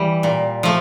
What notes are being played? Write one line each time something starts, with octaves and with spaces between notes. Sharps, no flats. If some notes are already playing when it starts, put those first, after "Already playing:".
Already playing: E3 G3
A#2
F3 A3